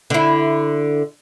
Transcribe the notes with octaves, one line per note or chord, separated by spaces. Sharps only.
D3 E4